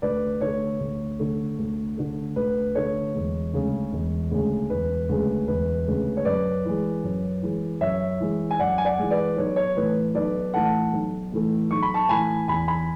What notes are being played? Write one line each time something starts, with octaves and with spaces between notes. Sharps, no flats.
D2 B4 D5
D3 A3 C#5
D2
D3 A3
D2
D3 A3
D2 B4
D3 A3 C#5
E1
D2 C#3 G#3
E1
D2 C#3 G#3
E1 B4
D2 C#3 G#3
E1 B4
D2 C#3 G#3
C#5
F#2 B4 D5
E3 G#3
F#2
E3 G#3
F#2 C#5 E5
E3 G#3
G#5
F#2 D5 F#5
G#5
D5 F#5
E3 G#3
B4 D5
B1 C#5
C#5
A2 E3 A3 B4
B1 B4 D5
A2 E3 A3 F#5 A5
B1
A2 E3 A3
B1 C#6
B5
A5 C#6
A2 E3 A3 G#5 B5
E2 G#5 B5
G#5 B5